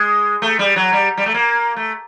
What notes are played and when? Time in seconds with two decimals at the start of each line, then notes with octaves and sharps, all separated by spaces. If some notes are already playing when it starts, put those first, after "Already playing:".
Already playing: G#3
0.42 A3
0.59 G3
0.76 F#3
0.93 G3
1.17 G3
1.26 A3
1.34 A#3
1.76 A3